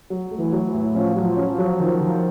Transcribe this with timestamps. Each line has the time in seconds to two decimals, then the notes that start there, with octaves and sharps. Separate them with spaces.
0.10 F#3
0.31 A3
0.38 E3
0.52 F#3
0.67 E3
0.74 A2
0.95 F3 C#4
1.16 F#3
1.23 F3
1.37 C#4
1.51 F3
1.58 F#3
1.80 D#3 F3
2.01 D#3